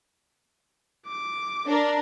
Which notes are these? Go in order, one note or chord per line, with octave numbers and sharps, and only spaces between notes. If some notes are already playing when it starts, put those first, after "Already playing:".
D6
D4 A#4